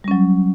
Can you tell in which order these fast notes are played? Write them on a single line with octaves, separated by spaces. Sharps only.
G3 C#4 F#3